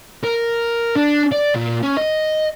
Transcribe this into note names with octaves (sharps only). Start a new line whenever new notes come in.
A#4
D4
D5
A#2
C#4
D#5